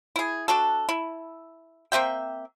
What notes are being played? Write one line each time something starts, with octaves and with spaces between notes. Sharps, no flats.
E4 G#4
D4 F#4 A4
E4
A#3 C4 E5 G5